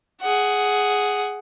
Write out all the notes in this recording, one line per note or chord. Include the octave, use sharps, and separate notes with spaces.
G#4 F#5